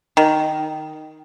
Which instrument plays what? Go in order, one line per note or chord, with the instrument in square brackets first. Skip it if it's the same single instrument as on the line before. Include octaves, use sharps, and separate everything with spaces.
[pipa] D#3